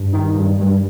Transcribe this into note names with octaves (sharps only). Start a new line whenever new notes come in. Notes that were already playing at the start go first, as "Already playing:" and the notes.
Already playing: G2
D#3
G2
G2